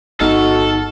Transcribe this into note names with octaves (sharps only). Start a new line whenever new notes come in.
G1 B3 D#4 F#4 A4 F6